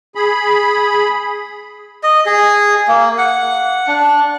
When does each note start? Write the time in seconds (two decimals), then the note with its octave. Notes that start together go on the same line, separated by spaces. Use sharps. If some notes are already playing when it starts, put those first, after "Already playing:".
0.15 G#4 B5
2.03 D#5
2.26 G#4
2.88 A#3
3.18 F#5
3.88 D4